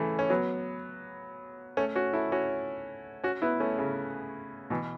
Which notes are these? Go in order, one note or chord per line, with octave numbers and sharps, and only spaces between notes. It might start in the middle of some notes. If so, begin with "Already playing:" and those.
Already playing: C#3 E3 A3
C#4
F#3 B3
A3 C#4
C#4 F#4
E4 A4
C#4 F#4
C#4 F#4
B3 E4
A3 C#4
C#3
B2 E3